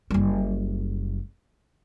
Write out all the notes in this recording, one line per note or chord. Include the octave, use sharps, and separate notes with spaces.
F#1 G3